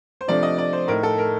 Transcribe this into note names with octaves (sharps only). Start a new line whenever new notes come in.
C5
C3 F3 A3 D4 D5
D#5
D5
C5
A2 A3 D#4 A#4
A4
A#4